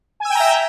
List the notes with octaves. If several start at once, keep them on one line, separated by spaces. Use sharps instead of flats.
E5 G5 G#5 A#5 E6